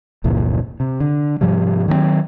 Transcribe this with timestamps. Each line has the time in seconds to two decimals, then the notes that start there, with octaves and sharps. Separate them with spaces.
0.24 F1 C#2 A#2 E3
0.80 C3
1.00 D3
1.41 G#2 C3 F3 G3
1.88 D#3 F#3 G#3 C4